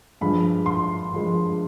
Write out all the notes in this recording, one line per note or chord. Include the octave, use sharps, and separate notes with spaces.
G2 F3 G#3 B5
C6
F3 G#3